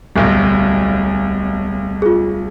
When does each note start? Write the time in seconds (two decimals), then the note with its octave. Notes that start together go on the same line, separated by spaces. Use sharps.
0.16 D1 B1 G3 A#6
2.02 F4 G#4